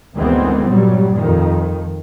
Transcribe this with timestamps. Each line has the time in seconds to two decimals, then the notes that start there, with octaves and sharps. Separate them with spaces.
0.16 D2 D#3 E3 G#3 B3 C4
0.70 G2 A#2 F#3 G3
1.19 F2 D#3